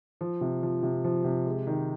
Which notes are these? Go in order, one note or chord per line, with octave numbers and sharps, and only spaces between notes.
F3
C3
F3
C3
F3
C3
G#3
D#3